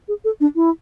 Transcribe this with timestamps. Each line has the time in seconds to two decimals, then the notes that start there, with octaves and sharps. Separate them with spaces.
0.08 G#4
0.25 A4
0.40 D4
0.56 E4